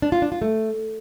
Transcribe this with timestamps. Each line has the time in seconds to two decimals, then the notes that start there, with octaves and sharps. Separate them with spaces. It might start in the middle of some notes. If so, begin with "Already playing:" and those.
0.02 D4
0.12 F4
0.22 D4
0.32 F4
0.42 A3